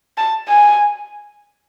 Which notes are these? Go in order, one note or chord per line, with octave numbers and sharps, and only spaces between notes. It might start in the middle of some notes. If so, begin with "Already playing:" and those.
A5
G#5